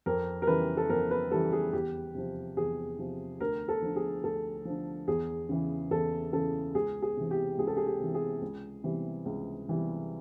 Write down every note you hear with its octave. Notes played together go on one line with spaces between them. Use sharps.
F2 A#4
A#4
C#3 E3 G3 B4
A4
F2 A#4
B4
C#3 E3 G3 A4
G#4
E2 G4
C3 F3
E2 G#4
C3 F3
D2 A#4
A4
D3 F3
G#4
D2 A4
D3 F3
E2 G#4
C#3 E3
E2 A4
C#3 E3 A4
C#2 G#4
G#4
C3 E3
G4
C#2 G#4
A4
G#4
G4
C3 E3
G#4
C#2
C3 E3 G3
C#2
C3 E3 G3